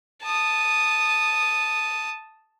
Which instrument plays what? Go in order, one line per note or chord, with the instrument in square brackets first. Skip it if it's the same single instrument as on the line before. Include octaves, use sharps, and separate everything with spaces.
[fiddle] A5 D#6